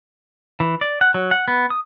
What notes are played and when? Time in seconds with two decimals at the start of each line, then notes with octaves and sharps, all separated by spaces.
0.60 E3
0.81 D5
1.01 F#5
1.14 F#3
1.31 F#5
1.48 B3
1.70 D#6